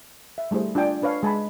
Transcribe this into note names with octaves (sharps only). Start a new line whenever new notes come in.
E5
G3 A3 E4 G#4 C5
D4 F4 D5 G5 G#5
D4 B4 C#5 F5 A5
G#3 G#5 A5 B5